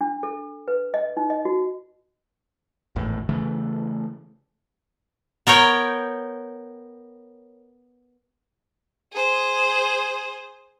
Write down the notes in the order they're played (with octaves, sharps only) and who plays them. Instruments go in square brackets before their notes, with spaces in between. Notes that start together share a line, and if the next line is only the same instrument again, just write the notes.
[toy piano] D4
A4
B4
D#5
D#4
D#5
F#4
[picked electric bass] G#1 E2 A2
C#3 E3 A3
[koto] B3 A#4 C#5 G5
[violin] G#4 C5